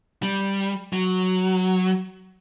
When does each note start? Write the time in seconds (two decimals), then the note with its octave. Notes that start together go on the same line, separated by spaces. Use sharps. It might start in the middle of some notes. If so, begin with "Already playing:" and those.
0.23 G3
0.93 F#3